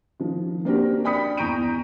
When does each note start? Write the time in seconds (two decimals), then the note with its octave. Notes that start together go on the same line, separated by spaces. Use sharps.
0.20 D#3 F3
0.65 A#3 C4 D4 F#4 G4 A#4
1.04 D5 G5 B5 D#6 B6 C#7
1.37 E2 A#5 C#6 G6 D7 D#7